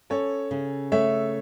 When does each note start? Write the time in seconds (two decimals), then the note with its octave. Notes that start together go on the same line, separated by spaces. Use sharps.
0.10 C#4 A4 C#5
0.51 C#3
0.92 A3 C#5 E5